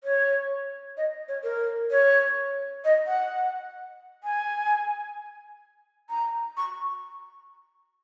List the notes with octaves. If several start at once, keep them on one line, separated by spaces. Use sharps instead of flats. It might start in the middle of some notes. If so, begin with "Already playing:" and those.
C#5
D#5
C#5
A#4
C#5
D#5
F#5
G#5
A#5
C#6